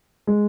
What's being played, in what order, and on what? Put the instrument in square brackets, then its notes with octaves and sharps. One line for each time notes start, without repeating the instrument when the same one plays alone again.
[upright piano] G#3